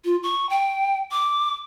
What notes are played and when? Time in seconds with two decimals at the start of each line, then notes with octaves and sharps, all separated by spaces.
0.05 F4
0.23 C#6
0.50 G5
1.12 D6